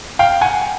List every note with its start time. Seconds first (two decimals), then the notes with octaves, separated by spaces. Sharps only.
0.19 F5 G5
0.41 F#5 G#5